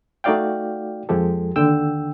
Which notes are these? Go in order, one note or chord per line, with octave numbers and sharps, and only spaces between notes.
A3 D#4 F#4 D5 F5 G5
F2 F3 G#3 G4 A4
D#2 D3 G5 E6